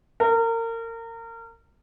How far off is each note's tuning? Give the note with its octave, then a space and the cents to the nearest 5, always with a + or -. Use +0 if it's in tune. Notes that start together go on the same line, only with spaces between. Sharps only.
A#4 -30